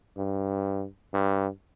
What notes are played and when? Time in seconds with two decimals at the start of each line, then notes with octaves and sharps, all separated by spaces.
0.17 G2
1.14 G2